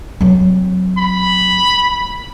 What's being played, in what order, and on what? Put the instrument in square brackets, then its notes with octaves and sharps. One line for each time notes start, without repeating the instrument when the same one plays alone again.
[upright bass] F#3 C4
[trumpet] B5